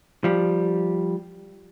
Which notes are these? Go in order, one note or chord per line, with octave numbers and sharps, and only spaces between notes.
F3 G3